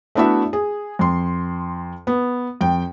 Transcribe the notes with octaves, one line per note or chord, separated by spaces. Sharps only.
A3 B3 D4 E4 F#4 E5
G#4
F2 C6
B3
F2 G5